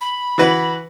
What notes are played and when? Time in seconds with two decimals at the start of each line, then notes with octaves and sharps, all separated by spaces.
0.01 B5
0.38 E3 F#4 B4